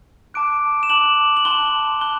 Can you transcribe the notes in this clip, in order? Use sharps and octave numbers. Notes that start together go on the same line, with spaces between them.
A5 D6 F#6 D7
E7
A5 D6 F#6 F#7
F#7
A5 C6 F#6 G7
A5 C6 F#6 G7